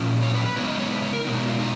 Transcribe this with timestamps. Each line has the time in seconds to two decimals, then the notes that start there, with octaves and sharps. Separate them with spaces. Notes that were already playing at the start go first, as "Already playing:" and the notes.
Already playing: A#2 F3 C#4
0.22 C#5
0.34 B4
0.45 B4
0.57 C#3 G#3 B3 D#4 C#5
0.68 D#5
0.80 C#5
0.91 B4
1.02 C#5
1.13 A#4
1.25 B2 G#3 B3 D#4
1.36 F#4
1.48 F4
1.59 D#4